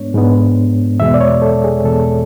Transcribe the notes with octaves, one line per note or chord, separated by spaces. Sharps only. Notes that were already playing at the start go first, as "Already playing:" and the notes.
Already playing: G#2 G#3 B3 D4 C#5
G#2 G#3 B3 D4
E2 B2 G#3 E5
D5
C#5
A4
G#4
E2 B2 G#3 A4